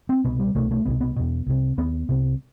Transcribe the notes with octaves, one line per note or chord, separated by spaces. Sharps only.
C4
C2 B2 B3
G3
C2 B2 A3
A3
C2 B2 B3
B3
E2 B2
C2 C3
D#2 B3
C2 C3